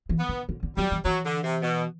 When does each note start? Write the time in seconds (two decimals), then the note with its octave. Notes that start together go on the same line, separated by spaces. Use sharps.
0.09 E3
0.19 B3
0.29 D3
0.49 D3
0.63 D3
0.77 F#3 G3
0.92 E3
1.05 E3 F#3
1.25 D3
1.44 C3
1.62 B2